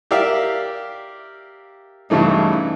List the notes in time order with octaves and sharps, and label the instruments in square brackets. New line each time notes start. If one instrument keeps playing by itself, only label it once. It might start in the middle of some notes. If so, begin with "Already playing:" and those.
[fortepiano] G4 A#4 D5 E5 F5
G2 C#3 E3 A3 D#4